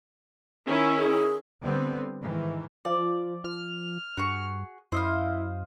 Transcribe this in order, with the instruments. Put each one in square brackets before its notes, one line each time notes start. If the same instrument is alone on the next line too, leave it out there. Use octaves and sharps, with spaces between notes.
[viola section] D#3 C#4 E4
[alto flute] G#4
[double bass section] D3 G3 B3 C4
G#2 D#3 E3
[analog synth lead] F3 [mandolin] D5
[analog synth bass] F3 [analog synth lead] F6
[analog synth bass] G2 [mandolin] F#4 G#4 C#6
[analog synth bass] F#2 [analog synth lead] E4 [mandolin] C5 D#5 F5